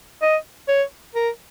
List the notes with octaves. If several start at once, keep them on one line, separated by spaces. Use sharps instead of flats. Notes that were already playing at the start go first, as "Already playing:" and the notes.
D#5
C#5
A#4